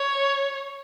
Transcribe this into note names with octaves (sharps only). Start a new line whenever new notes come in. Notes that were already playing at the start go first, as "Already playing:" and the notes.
Already playing: C#5